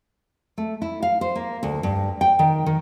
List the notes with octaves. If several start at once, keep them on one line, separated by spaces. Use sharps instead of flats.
A3
E4
F5
C5
A#3
D2
G2
G5
D#3
D#3